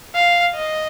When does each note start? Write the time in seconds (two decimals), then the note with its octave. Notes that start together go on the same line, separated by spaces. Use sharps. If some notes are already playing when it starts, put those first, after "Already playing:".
0.15 F5
0.54 D#5